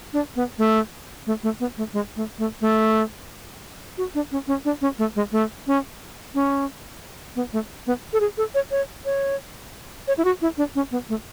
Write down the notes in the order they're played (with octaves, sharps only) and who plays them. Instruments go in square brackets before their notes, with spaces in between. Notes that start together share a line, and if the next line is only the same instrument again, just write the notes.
[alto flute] D4
B3
A3
A3
A3
B3
A3
G#3
A3
A3
A3
F#4
D4
C#4
C#4
D4
C#4
A3
G#3
A3
C#4
C#4
B3
A3
B3
A4
G#4
A4
C#5
C#5
C#5
C#5
E4
F#4
E4
D4
C#4
B3
A3